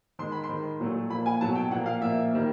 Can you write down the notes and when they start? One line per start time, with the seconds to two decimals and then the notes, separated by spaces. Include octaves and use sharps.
0.19 D#3 G#3 C6
0.32 B5
0.43 C6
0.49 D#3 G#3
0.80 A#2 F#3 A3
1.10 A#2 F3 A#3 B5
1.26 G#5
1.40 B2 F#3 A3 A5
1.55 G5
1.71 A#2 F3 A#3 F#5
1.86 F5
2.01 A#2 F3 A#3 E5
2.31 D#3 G3 A#3